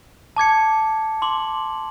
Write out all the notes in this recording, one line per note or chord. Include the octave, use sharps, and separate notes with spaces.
A5 D6 G#6 C#7
C6 D6 F#7